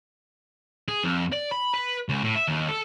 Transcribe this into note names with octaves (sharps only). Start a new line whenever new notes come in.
G#4
F2
D5
B5
B4
C#2
A2
E5
D#2
A4